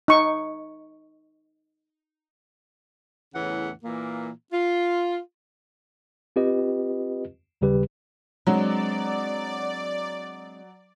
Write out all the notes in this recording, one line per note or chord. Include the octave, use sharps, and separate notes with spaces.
D#4 C#6
E2 A2 C#3 E3 F#5
A#2 E3 A#3
F4
C4 F4 G4 B4 D#5
D#2 C#3 G3 G4 B4
F#3 G#3 C4 D4 D5